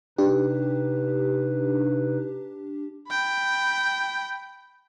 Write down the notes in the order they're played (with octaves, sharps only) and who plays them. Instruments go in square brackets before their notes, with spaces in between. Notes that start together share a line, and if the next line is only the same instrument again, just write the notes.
[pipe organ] C3 D#4 B4 [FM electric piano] D4 G4
[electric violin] G5 B5